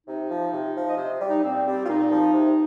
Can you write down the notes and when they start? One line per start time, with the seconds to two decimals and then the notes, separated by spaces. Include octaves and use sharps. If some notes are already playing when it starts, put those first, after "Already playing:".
0.07 C3 D#4
0.30 F3
0.52 C3
0.75 F3
0.88 D#5
0.97 C3 C5
1.20 G3
1.28 D#4
1.43 A#2 C4
1.66 G3 C4
1.84 F4
1.88 A#2 D#4
2.11 F3
2.33 C3